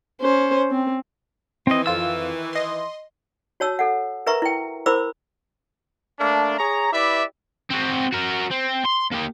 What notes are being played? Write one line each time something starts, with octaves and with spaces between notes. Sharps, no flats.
C#4 C5
C4
D#3 E3 C4 D#5
F2 F4 E6 D#7
D#5 C6
F#4 C#5 A5 E6
A4 F#5
A#4 B4 E5 A#5 C#6
E4 G5
E4 A#4 C5 B5 D6 E6
A3 A#3 D4
G#4 C#5 A#5
E4 G4 B4 D5 E5
C4 F#4
F#4 A#4
C4
C6
A#3 G4